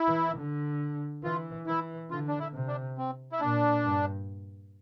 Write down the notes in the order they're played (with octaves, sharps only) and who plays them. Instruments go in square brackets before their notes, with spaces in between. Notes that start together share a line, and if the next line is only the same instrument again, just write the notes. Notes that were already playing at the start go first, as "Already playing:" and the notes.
Already playing: [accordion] E4
[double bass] E3
D3
[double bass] E3 [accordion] F4
[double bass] E3 [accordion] E4
[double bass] D3 [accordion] F4
[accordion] D4
E4
[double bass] C3
[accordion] D4
C4
E4
[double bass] A#2 [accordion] D4
[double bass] G2